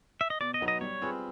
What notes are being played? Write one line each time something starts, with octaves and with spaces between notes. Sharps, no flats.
E5
D#5
B2 D5
D#5
F#3 B3 D#4
D#5
G3 C#5
C4 F4 G#4 B4